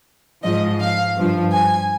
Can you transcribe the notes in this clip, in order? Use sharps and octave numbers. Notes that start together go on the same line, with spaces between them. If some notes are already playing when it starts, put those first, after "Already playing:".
G#2 F3 D#5
F5
G2 F3
G#5